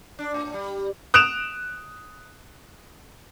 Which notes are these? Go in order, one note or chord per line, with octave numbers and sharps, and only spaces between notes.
D4
A2
G3
D#6 F#6 D7 E7 F7